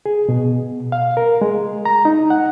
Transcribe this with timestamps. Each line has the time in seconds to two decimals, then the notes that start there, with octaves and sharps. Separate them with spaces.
0.06 G#4
0.29 B2
0.92 F5
1.17 A#4
1.42 G#3
1.85 A#5
2.05 D#4
2.30 F#5